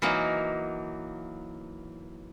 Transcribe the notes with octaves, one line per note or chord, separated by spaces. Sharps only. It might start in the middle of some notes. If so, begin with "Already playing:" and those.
E3 F#3 A#3 D#4